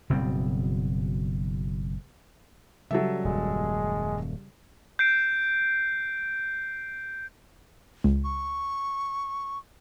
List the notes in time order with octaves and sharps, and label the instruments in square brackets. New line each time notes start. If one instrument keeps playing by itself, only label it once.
[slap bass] F#1 B2 G3 C4
[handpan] C#3 G3 [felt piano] F#3 A4 E5
[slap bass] D#1 F#2 [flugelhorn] G#3
[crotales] G6 C7 D7
[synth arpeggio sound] C#2
[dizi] C#6